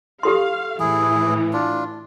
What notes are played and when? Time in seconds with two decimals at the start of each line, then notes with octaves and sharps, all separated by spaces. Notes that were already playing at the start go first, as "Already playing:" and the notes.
0.23 G4 A4 F5 C6
0.80 A2 E3 E4 G#4
1.53 D4 F4